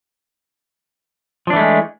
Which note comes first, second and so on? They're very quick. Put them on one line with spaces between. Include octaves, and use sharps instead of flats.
F3 D4 E3 A3 G#3